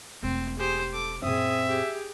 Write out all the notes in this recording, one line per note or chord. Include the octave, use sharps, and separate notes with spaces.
E1 A3 C4
G4 G#4 C5
A4 D6
F#2 A#2 C4 G#4 E5 D#6
G4 G#4